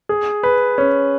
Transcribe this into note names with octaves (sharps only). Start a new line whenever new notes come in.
G#4
B4
C#4